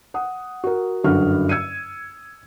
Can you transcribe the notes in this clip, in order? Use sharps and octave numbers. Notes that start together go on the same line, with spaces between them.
F#5 D#6
F#4 A#4
F#1 G2 D3 F#3 F#4 F6
E6 G#6 C#7 D#7